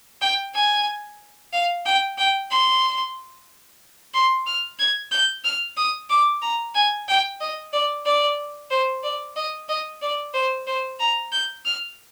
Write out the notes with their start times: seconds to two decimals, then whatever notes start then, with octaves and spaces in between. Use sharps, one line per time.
0.21 G5
0.55 G#5
1.53 F5
1.86 G5
2.18 G5
2.51 C6
4.14 C6
4.46 F6
4.79 G#6
5.12 G6
5.44 F6
5.77 D#6
6.10 D6
6.42 A#5
6.75 G#5
7.08 G5
7.40 D#5
7.73 D5
8.05 D5
8.71 C5
9.03 D5
9.36 D#5
9.69 D#5
10.02 D5
10.34 C5
10.67 C5
11.00 A#5
11.32 G6
11.65 F6